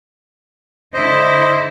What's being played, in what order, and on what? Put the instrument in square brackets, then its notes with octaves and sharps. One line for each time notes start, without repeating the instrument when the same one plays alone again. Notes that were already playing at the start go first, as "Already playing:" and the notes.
[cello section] D3 E4 [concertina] C5 D#5